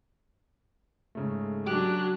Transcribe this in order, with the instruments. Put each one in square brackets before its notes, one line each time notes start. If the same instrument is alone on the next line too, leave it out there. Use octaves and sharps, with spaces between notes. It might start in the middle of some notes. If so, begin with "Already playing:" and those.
[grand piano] G#2 C#3 A3
[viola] F#3 [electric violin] D4 F#6 [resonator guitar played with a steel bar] G4